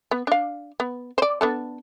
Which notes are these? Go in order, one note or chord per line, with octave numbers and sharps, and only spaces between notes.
B3
D4 F5
B3
C5 D5
B3 D4 A4